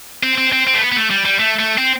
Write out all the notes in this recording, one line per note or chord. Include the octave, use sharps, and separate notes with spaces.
C4
C4
C4
C4
A3
B3
B3
A3
G3
G3
A3
A3
C4